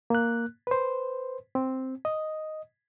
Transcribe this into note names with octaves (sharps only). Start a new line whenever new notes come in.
A#3 F#6
B4 C5
C4
D#5